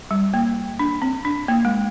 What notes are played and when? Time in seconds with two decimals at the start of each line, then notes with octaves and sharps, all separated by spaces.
0.11 G3
0.34 A#3
0.79 D4
1.02 C4
1.25 D4
1.48 A#3
1.65 G#3